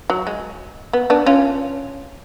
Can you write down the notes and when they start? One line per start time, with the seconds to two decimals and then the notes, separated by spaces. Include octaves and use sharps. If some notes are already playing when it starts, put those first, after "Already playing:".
0.10 F#3
0.27 G#3
0.93 B3
1.10 B3 D4
1.26 C#4 F4